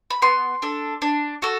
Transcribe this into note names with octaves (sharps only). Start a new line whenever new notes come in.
B5
B3 C6
D4 A4
D4
F#4 A4